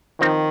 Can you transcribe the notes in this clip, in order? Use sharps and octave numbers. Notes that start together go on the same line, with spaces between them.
D#3 F3 C4 D#4